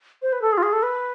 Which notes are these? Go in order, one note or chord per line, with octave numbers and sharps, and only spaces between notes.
C5
B4
A4
G#4
F4
G#4
A4
B4